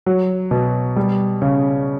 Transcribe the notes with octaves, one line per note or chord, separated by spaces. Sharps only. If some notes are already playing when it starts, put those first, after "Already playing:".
F#3
B2
G3
C#3